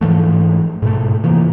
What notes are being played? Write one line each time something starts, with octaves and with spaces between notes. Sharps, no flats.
G#2 E3 F3 A3
G#2 B2 A3
C3 E3 F3 A#3